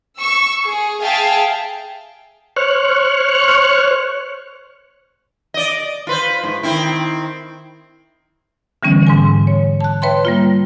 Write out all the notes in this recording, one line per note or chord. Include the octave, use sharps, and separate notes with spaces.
C#6 E6
G#4
G#4 E5 F5 G5 A5
C5 C#5 C#6 F6 F#6
D5 D#5
F4 B4 C5
G#2
D#3 C4 E4
D3 E3 G3 B3 C#4
G#2 C#4 G#5
C#5
A5 F#6
B4 C#5 E5 G5 B5 C6
G3 A#3 F4